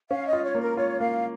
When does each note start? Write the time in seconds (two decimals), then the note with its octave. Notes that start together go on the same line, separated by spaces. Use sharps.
0.10 C#4 F5
0.27 D#5
0.33 F4
0.44 C#5
0.55 A#3
0.61 A#4
0.77 F4 C#5
1.00 A#3 F5